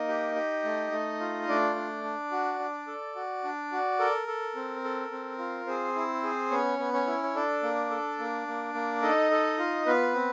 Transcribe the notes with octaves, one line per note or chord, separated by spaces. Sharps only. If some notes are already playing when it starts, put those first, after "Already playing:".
Already playing: A#3 D#4 D#5
G4
G4
A3
A3
F4
A3 D4 D5
D4
D4
F#4
D4
A4
F#4
D4
F#4
A4 A#4
A4
C4
A4
C4
F4
C4 G#4 C5
E4
G#4
B3 C#4 C#5
B3
C#4 C#5
E4
C#5
D4 A4 D5
A#3
A4
A#3
A#3
A#3
D#4 A4 D#5
A4
F4
B3 F4 B4
C4